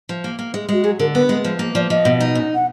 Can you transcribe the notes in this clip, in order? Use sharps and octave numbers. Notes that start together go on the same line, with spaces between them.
F3
A#3
A#3
G#3
G#3 F#4
F#3 G#4
D3 A#4
B3 B4
G#3
F3
A#3
F3 D5
F3 D#5
B2
D#4
F#2
F#5